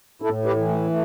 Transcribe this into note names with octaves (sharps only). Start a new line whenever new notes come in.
A2 E4 A4
G4 B4
E3
A3
A3